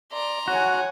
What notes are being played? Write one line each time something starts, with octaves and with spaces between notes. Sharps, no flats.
D5 A#5 C6
F#4 C#5 F#5 G#5